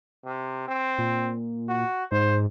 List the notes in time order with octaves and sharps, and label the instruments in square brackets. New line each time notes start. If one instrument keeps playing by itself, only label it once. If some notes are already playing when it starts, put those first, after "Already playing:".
[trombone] C3
C4
[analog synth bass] A#2
[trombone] F#4
[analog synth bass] G#2 [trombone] C5